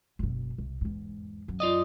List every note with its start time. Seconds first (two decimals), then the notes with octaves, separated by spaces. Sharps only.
0.19 F#1 B2
0.58 C2
0.81 E2 G#2
1.48 F#2
1.60 F4 D5 D#5